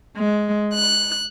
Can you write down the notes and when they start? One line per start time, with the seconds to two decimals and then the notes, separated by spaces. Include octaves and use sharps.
0.16 G#3
0.73 F#6